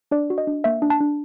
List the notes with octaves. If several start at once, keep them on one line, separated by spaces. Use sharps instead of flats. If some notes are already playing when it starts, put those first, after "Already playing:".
D4 D5
F#4
D#5
D4
A#3 E5
D4
A5
D4